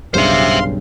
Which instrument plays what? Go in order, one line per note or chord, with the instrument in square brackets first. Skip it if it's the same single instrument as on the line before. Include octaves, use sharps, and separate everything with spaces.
[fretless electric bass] B1 G2 C#3 [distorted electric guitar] C5 E5 [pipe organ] F5 C6